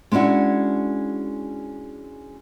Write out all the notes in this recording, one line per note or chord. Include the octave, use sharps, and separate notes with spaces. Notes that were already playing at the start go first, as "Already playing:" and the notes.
G#3 C#4 D4 E4 F#4